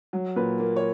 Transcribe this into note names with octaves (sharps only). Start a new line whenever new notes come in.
F#3
A#2 B4
A#3
C#5